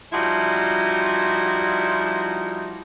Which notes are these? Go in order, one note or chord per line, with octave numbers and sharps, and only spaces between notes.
F3 G3 D#4 E4 F#4